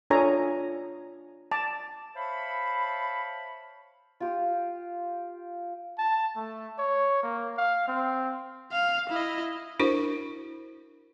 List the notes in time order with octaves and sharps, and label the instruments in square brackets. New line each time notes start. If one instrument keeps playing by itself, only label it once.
[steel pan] D4 F4 A4 C#5 G#5 A#5
A5 D6
[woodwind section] C5 C#5 E5 F5 A5 B5
[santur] F4 G4
[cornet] A5
A3
C#5
A#3
F5
C4
[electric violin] F5
E4 D#5
[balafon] D4 E4 F#4 A#4 C5